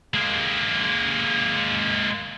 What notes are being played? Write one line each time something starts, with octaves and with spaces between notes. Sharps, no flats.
G#3 A#3